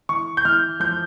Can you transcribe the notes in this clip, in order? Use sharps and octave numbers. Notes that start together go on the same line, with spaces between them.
E3 C#6
G6
E3 F6
F3 G6